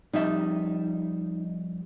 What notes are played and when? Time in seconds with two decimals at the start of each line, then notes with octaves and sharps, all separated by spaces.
0.13 F2 G3 D#4 E5